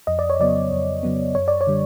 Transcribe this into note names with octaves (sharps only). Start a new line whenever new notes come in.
F2 D#5
D5
C#5
C#3 F#3 B3 D5
F2
C#3 F#3 B3
F#2 C#5
D5
C#5
D3 G3